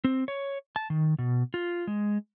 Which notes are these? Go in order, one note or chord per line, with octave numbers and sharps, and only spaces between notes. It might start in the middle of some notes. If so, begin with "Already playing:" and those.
C4
C#5
A5
D#3
B2
F4
G#3